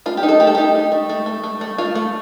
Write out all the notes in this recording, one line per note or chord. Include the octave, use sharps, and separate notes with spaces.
A3 F4
G4
D#4
A4
A3 G4
A4
D#4 G4
D#4
A3
A3
A3
A3
A3
A3 F4
A3